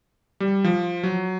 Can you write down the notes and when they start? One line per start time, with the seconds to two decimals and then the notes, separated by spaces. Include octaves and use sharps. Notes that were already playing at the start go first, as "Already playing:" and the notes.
0.40 G3
0.64 F3
1.03 F#3